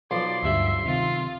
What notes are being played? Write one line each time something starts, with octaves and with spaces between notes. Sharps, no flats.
B1 F3 D5 C6
D2 G2 G3 E5
C3 D#3 C4 F4